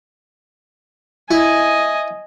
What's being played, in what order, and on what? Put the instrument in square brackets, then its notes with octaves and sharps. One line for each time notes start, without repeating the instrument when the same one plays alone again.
[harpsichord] E4 [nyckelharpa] D#5 G#5